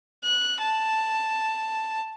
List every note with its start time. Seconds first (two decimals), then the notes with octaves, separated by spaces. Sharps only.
0.24 F#6
0.60 A5